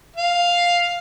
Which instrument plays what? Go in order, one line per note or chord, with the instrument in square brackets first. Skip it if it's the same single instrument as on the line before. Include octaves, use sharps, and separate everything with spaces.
[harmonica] F5